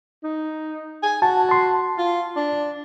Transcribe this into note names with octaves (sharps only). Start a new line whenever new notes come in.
D#4
G#5
F#4 A5
A5 C6
F4
D4